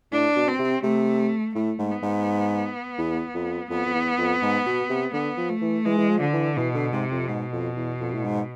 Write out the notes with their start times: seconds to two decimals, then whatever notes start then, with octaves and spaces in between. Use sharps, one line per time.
0.11 A2 D4
0.36 B2
0.48 C4
0.59 C3
0.83 C3 A3
1.55 A2 A3
1.79 G#2
1.91 B3
2.03 G#2
2.98 E2
3.34 F2
3.70 F2 B3
3.86 F2
3.94 E2
4.18 F2
4.42 G#2
4.66 B2
4.90 C3
5.13 D3 B3
5.37 F3
5.49 A3
5.61 E3
5.85 E3 G#3
5.98 E3
6.09 F3
6.21 D3
6.33 E3
6.57 B2 E3
6.75 D3
6.92 G#2 C3
7.11 F2
7.28 G#2 B2
7.52 F2
7.76 E2
8.00 F2
8.14 A2
8.24 G#2